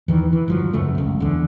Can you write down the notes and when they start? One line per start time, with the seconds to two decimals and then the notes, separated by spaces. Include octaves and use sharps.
0.08 E2 D#3 E3
0.33 E3
0.48 G1 F3 F#3
0.73 C#2 F#2 A3
0.98 F#1 C#2
1.20 E2 D3